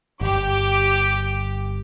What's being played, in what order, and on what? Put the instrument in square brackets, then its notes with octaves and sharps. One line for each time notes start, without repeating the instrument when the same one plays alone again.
[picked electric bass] G1 [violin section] G4 D6